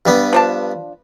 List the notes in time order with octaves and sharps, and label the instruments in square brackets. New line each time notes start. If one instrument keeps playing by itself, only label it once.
[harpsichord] G2 G3 B3
[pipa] F3 D4 A5